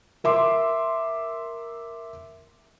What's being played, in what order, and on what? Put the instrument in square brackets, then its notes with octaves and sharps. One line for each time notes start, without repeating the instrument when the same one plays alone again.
[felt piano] A#4 E5 C6 D6